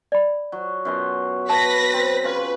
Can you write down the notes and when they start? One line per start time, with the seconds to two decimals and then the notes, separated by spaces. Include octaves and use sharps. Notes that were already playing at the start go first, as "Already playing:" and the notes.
0.12 D5 B5
0.52 F#3
0.85 F#2 B2 C6
1.50 B4 A5 A#6 B6
1.93 C4
2.24 C#3 F4 B4